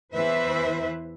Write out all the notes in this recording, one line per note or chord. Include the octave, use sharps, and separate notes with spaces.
E2 E3 B4 C5 E5